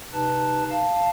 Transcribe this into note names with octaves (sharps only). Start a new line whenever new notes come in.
C3 D#4 B4 A5
F5 A5